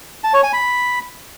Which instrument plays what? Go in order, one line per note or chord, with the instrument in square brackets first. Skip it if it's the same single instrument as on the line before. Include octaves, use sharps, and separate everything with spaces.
[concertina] A5
C#5
G#5
B5